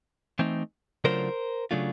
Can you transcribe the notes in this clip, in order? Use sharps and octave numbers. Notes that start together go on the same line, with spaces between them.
E3 A3 C4 D#4
C#3 F#3 A3 D4 F4 A#4 C5
C#3 F#3 A3 D4 F4